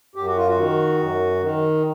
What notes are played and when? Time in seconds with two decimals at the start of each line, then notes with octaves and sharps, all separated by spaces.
0.15 F#2 G4
0.26 F#4
0.37 F4
0.48 F#4
0.57 D#3
0.99 F#2
1.41 D#3